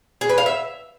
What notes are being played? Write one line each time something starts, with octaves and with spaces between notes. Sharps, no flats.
G#4
B4
F5
E5